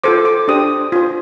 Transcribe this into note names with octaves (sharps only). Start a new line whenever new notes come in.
F4 A4 C5 D6
D6
D4 G4 C5 D#6
F4 C5